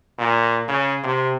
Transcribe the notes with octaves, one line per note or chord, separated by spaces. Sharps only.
A#2
C#3
C3